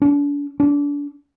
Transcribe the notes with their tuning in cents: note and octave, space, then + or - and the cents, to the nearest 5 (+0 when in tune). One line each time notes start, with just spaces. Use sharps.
D4 -40
D4 -30